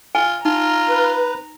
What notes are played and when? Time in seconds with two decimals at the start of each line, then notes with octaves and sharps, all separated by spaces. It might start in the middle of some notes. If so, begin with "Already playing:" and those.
0.15 F4 G#5
0.45 D#4 F4 A#5
0.89 B4